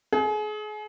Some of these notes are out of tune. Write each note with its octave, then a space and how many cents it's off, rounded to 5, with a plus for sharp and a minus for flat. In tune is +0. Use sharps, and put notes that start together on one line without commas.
G#4 +35